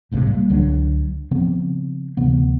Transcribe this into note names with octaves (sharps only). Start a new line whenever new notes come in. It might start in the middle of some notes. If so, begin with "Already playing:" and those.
F1 B1 A2 C3
G3 A#3
C#2 D3 F#3 D4
C#3 F3 B3 C4
D2 C3 E3 B3